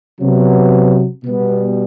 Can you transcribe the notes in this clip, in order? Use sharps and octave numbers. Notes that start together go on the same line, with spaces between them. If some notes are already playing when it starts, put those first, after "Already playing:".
C3 F#3 B3
B2 G3 B3